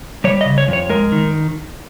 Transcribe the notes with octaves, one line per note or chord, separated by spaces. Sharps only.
G3 C#5
D#5
C#3
C#5
F2
C#5
G#3 A#4
D#3